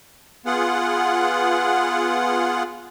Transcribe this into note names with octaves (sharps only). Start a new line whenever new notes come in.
B3 F4 G#4 F#5